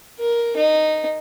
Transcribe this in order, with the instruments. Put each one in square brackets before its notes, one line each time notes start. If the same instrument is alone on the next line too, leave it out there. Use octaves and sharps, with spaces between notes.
[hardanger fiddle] A#4
D#4